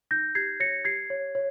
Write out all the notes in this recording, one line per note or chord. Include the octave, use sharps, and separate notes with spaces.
D#4 G6 A#6
G4 G#6 C7
C#5 A#6 C#7
G4 G#6 C7
C#5
C#5